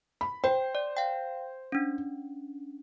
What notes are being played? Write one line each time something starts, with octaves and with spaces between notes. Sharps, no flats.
B5
C5 G5
D5
F5 G5
C#4 D4